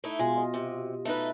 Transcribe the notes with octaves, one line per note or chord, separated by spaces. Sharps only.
A3 D#4 E4
B2 G#3 F4
D#5
C3
A3 D#4 B4